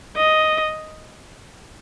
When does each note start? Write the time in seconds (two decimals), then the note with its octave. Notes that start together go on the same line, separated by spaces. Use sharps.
0.17 D#5